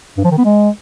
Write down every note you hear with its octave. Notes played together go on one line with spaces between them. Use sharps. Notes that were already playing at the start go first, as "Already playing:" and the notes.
G2
F3
D#3
B3
G#3